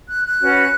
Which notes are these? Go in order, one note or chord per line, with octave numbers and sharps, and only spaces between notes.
F#6
F#6
C#4 F#4 B4